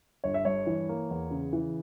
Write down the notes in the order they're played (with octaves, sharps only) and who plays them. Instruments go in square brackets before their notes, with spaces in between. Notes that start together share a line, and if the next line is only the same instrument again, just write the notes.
[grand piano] G1 C#5
E5
G2 C#5
E3
A#3
E2
C#3
E3